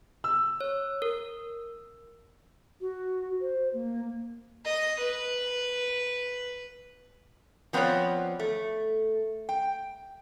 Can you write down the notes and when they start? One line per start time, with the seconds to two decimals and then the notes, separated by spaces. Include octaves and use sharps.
0.24 E6
0.61 C#5
1.02 A#4
2.81 F#4
3.41 C5
3.73 A#3
4.66 D#5
5.00 B4
7.73 F3 B3 C4 B4 C#5 D5
8.39 A3
9.49 G5